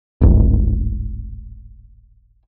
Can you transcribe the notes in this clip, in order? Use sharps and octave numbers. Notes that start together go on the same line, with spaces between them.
D1 G#1